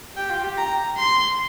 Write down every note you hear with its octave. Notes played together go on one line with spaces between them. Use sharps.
G4 G5
F4
G4
A#5
C6